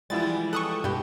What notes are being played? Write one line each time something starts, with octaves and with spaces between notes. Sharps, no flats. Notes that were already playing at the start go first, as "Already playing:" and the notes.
E3 F3 G3 G#3 B3 E4 A6
A4 C#6 D#6 F#6
G2 B2 G4